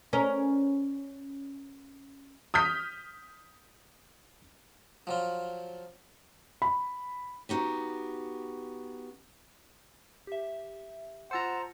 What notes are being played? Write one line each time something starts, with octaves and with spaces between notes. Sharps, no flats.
C#4 A#4
D#6 F6 G6 B6
F3 F#3 F4
B5
B3 D#4 F#4 G4
G4 E5
F4 C5 F#5 A5 A#5 E6 C#7